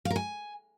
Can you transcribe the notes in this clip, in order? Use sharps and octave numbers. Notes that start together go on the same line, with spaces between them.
F5
A#4
G#5